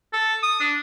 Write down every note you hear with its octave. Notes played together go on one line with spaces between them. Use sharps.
A4
D#6
D4